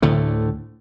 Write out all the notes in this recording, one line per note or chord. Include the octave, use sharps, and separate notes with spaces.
D2 A2 D3 A3